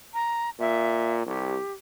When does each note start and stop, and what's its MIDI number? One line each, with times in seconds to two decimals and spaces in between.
0.14 0.50 82
0.60 1.22 46
0.60 1.14 76
1.27 1.59 36
1.27 1.72 67